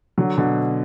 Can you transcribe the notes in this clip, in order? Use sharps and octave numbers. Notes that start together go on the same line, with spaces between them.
D3 F#3
B2 D3